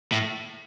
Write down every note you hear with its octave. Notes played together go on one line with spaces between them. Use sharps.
A2